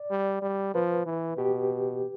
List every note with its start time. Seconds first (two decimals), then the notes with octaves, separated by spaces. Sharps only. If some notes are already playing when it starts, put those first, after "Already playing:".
Already playing: D5
0.10 G3
0.42 G3
0.74 F3 B4
1.06 E3
1.37 B2 G4